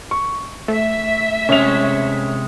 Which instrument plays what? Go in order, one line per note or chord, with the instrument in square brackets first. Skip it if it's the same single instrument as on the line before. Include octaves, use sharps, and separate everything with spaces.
[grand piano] C#6
[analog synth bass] A3 [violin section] E5
[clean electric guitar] C3 G#3 C#5 [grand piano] C#4 F7